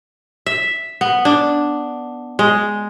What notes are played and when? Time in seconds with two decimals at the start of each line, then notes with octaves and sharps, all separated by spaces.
0.46 E5
1.01 B3
1.25 D4
2.39 G#3